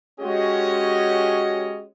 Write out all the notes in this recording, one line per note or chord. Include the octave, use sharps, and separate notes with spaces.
G#3 C#4 F#4 G4 C#5 D#5